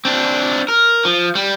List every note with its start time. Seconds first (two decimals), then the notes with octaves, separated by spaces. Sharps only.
0.05 C4 D4
0.68 A#4
1.05 F3
1.35 G3